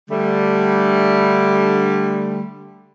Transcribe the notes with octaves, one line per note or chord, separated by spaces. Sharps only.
D3 G3 A3